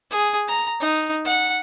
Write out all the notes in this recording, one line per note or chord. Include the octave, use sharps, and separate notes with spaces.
G#4
A#5
D#4
F#5